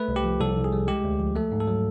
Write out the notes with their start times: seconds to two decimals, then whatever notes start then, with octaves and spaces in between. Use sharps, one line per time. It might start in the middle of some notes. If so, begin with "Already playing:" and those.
Already playing: A3 B4
0.08 C2
0.16 G4
0.24 F3
0.40 C2 A4
0.57 C2
0.64 G#4
0.72 G3
0.88 G#3 G4
1.04 D2
1.20 F3
1.36 A3 A4
1.52 G#2
1.60 A4
1.67 F#3